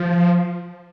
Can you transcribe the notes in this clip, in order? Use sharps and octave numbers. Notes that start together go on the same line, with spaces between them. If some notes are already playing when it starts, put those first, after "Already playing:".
Already playing: F3